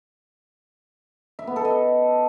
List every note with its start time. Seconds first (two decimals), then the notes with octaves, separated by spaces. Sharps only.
1.39 E5
1.47 B3
1.56 A4
1.65 D#5